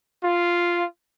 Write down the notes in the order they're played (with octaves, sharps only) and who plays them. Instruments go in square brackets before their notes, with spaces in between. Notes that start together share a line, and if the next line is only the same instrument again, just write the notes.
[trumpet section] F4